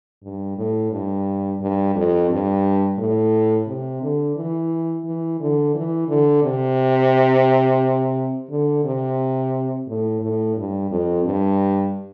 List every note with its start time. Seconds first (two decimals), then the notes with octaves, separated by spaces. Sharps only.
0.23 G2
0.57 A2
0.92 G2
1.61 G2
1.95 F2
2.30 G2
2.98 A2
3.67 C3
4.02 D3
4.36 E3
5.05 E3
5.40 D3
5.74 E3
6.08 D3
6.43 C3
8.50 D3
8.84 C3
9.87 A2
10.21 A2
10.56 G2
10.91 F2
11.25 G2